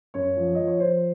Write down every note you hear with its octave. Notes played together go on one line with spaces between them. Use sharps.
F#2 C#5
F3
F3 D#5
C#5
F3 C5